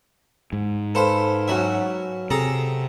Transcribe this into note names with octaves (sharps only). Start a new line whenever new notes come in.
G#2
A4 B4 C5 F5 A5
F#3 C#4 F#4 E5
C3 G#4 A4 A5 A#5